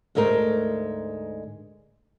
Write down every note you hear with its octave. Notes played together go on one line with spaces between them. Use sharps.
D2 G#2 G#3 A3 A#4